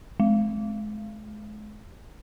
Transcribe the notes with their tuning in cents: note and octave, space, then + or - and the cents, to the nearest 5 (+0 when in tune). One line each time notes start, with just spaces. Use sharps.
G#3 +40